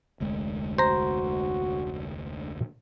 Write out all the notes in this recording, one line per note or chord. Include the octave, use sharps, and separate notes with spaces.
F1 D2 G#3
F#4 C5 A#5